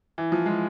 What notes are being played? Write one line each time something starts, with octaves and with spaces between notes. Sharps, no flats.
E3
F3
G#3